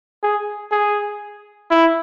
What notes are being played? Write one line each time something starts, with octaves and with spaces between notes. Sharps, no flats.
G#4
G#4
E4